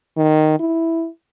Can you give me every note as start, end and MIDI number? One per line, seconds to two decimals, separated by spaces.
0.17 0.58 51
0.59 1.08 64